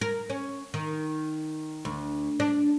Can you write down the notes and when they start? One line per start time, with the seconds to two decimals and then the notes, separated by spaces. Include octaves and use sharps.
0.01 A#4
0.30 C#4
0.74 D#3
1.85 D2
2.40 D4